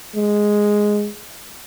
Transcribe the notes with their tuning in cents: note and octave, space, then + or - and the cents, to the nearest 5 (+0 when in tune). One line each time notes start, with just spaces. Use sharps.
G#3 +0